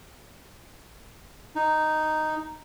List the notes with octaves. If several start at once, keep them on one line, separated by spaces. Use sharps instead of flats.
D#4